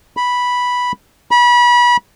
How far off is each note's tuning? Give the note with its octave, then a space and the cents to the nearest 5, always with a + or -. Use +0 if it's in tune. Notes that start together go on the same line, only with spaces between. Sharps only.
B5 -5
B5 -30